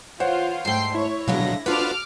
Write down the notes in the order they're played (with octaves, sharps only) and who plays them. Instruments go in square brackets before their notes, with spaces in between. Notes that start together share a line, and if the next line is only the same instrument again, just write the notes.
[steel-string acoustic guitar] E3 [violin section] F4 [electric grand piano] C5 C#5 F#5
[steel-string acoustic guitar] G#2 A3 [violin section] G5 C6 C7
[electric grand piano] E4 [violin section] C#5
[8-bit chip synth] B2 F#3 [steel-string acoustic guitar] D3 G#3 F5 [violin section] A#6
[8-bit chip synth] D4 F4 B4 [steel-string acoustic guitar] F#4 A4 C5 [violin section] D6 F6